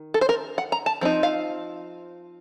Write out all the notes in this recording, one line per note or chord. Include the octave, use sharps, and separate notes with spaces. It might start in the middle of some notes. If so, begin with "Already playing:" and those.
Already playing: D#3
A4
C5
A#4
F#5
A#5
A5
F3 C4 D#4
F5